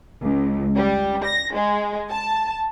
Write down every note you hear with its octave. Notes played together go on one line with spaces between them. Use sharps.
C#2
G3
A#6
G#3
A5